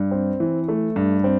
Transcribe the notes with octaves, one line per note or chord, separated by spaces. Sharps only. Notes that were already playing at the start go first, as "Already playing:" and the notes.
Already playing: G2
C4
E3
A3
G2
C4